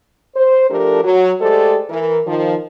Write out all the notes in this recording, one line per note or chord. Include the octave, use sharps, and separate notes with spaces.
C5
F3 A3 D4 G4 A4 A#4
F#3
G#3 A3 G4 A4 C5 D5
E3 A#4
D#3 F3